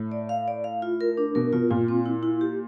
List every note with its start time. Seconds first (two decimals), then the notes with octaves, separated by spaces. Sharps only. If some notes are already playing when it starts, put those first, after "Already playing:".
Already playing: A2
0.12 D5
0.29 F5
0.48 D5
0.64 F5
0.82 F4
1.01 A#4
1.17 D4
1.35 B2 A#4
1.53 B2 F4
1.70 A#2 F4
1.88 C4
2.06 E4
2.23 E4
2.41 G4